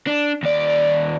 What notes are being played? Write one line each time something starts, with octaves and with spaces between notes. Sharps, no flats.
D4
D#2 D5